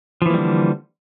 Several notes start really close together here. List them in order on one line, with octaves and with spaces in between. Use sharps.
F3 E3 A#3 G3 D3